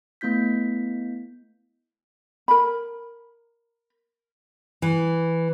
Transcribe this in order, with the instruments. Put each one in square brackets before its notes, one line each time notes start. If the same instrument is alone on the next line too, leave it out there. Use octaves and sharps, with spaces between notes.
[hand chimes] A3 B3 E4 G6 B6
[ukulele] A#4 B5
[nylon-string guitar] E3